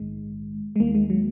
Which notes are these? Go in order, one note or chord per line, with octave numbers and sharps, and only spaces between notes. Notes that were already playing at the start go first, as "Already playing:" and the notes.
Already playing: A#1 G#2 D#3 G#3
G#3
D#2 D#3 A#3
G#3
F#3